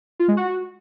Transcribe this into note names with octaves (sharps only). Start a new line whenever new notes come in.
F4
G#3
F#4